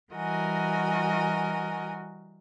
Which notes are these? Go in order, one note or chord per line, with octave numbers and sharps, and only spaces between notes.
E3 G3 F#4 A#4 D#5 G#5